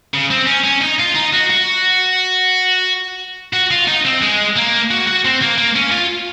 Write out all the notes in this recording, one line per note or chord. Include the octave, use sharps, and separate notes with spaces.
C#3
C4
C#4
C#4
D#4
F4
D#4
F#4
F#4
F#4
F4
D#4
C4
G#3
A#3
F#4
F#4
C4
A#3
A#3
C#4
F4